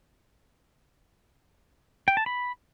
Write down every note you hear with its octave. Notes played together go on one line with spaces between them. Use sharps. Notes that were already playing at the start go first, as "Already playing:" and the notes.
G5
A5
B5